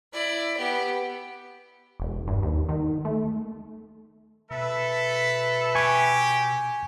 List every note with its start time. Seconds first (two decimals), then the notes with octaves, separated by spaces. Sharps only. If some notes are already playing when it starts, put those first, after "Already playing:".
0.13 E4 D5
0.58 B3 G4
2.00 E1
2.27 G2
2.42 D#2
2.69 D#3
3.05 A3
4.51 B2 A4 B4 E5
5.75 G4 G#5 C#6